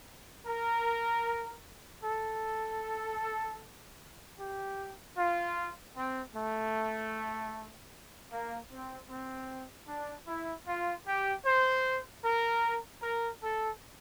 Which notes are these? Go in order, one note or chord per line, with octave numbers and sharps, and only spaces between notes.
A#4
A4
G4
F4
C4
A3
A#3
C4
C4
D4
E4
F4
G4
C5
A#4
A#4
A4